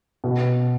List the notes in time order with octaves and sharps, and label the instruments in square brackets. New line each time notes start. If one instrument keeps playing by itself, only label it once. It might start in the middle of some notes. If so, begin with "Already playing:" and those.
[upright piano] B2